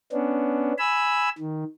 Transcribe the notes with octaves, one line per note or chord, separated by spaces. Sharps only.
B3 C#4 D4
G#5 B5 E6
D#3